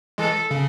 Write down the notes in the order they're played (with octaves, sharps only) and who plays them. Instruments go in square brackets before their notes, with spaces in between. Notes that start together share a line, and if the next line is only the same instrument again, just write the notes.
[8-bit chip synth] E3 G#3 [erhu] A4
[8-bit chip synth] C#3